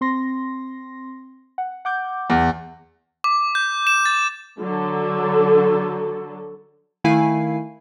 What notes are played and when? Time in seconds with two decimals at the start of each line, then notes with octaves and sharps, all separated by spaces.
0.01 C4 C6 A#6
1.58 F#5
1.85 F#5 D6 G6
2.30 E2
3.24 D6
3.55 G6
3.87 E7
4.06 A6
4.60 D3 F#3 A4
7.04 D#3 A3 E4 F5 G#5 C7